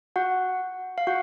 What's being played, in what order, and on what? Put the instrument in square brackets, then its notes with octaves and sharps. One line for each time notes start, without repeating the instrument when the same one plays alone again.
[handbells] F#4 F#5
F5
F#4 F#5